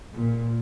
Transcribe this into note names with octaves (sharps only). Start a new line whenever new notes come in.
A#2